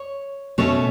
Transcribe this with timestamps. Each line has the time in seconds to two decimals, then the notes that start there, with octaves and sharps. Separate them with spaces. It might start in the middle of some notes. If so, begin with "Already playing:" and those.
Already playing: C#5
0.58 B2 A3 C#4 C#5